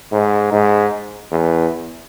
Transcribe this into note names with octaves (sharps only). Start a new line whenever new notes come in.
G#2
G#2
E2